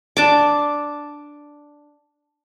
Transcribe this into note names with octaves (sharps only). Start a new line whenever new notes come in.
D4 A5 D6